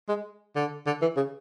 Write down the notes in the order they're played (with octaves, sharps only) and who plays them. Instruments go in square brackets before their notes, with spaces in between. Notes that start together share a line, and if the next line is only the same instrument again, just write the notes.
[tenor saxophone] G#3
D3
D3
E3
C#3